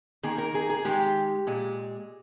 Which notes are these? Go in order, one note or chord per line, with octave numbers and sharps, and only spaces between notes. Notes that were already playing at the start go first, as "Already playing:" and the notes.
D#3 A#3 G#4
A#4
G#4
G#4
D#3 G#3 G4
A#2 G#3